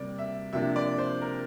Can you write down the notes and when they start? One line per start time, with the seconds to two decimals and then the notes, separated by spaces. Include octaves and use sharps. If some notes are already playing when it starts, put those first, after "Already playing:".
Already playing: C3 G3 A#3 D5
0.18 E5
0.53 C3 F3 A#3 D4 E5
0.76 D5
0.98 C5
1.21 A#4